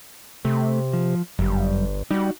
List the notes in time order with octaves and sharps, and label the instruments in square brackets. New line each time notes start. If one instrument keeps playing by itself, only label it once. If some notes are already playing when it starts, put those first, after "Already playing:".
[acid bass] C3 [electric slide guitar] A3
[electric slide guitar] F3
[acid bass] G1 [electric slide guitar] F#2 G3
[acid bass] G3 [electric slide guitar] D#4 F#4